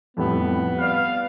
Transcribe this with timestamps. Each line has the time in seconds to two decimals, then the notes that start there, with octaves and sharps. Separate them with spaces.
0.17 F2 A2 G3 B3
0.79 B4 D5 F5